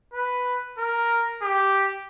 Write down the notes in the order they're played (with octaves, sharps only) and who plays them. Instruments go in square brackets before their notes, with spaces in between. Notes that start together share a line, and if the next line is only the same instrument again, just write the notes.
[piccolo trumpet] B4
A#4
G4